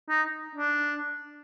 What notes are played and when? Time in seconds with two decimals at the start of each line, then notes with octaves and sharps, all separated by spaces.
0.09 D#4
0.55 D4